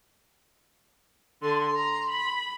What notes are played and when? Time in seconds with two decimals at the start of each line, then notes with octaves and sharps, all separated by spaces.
1.42 D3 C6
1.76 A#5
2.10 B5